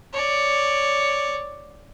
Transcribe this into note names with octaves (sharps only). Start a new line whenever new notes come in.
C#5 D5